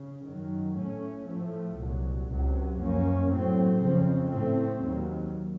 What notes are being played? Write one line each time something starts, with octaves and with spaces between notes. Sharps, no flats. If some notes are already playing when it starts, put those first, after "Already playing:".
Already playing: C#3
F#2 D#3 F#3
A2 A3 C#4
A2 F3 A3
C2 A#2 F#3
C#2 C3 F#3
F#2 F3 A#3 C#4
A2 F#3 C4
F2 C#3 F3 C4
A2 A3 C4
D#2 D#3 F#3